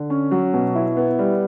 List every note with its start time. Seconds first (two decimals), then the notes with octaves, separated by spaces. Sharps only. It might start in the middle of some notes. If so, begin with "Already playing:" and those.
Already playing: D3
0.10 C#4
0.31 F#3
0.54 B2
0.75 E4
0.97 B3
1.19 G3